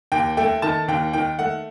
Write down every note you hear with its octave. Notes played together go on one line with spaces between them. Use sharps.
D#2 G5
A3 G5
D#3 A5
D#2 G5
D#3 G5
A3 F#5